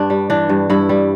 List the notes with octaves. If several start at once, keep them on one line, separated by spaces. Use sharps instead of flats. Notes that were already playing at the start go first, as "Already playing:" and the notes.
Already playing: G2 D4
G3
E3 D4
G2
G2 E4
G3